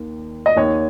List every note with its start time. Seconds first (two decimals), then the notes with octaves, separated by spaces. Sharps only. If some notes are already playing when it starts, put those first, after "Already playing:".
Already playing: D#2 D#3
0.46 D#5
0.57 D#2 D#3 C#5